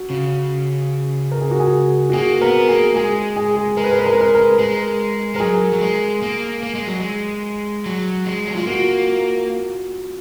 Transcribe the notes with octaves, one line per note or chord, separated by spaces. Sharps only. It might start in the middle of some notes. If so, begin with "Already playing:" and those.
Already playing: F#4
C#3
A#4
G#4
F#4
G#4
F#4
A#3 G#4
B3 A#4
A#3 G#4
G#3 G#4
G#4
G#4
G#3 A#4
B4
A#4
B4
A#4
B4
A#4
B4
A#4
G#3 A#4
G#3 A#4
F#3 G#4
F#3
G#3
A#3
A#3
G#3
F#3
G#3
F#3
G#3
F#3
G#3 F4
A#3 F#4